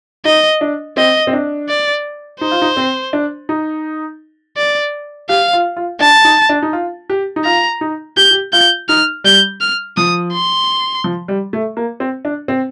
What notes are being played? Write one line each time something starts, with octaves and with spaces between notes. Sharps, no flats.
D#4 D#5
D4
C4 D#5
C4
D4
D5
D#4 C5
F4
D#4
C4
D4
D#4
D5
G4 F5
F4
F4
D4 A5
D#4
D4
D#4
F4
G4
D#4
F4 A#5
D#4
G4 G6
G4
F4 G6
D#4 F6
G3 G6
F6
F3 D#6
C6
F3
G3
A3
A#3
C4
D4
C4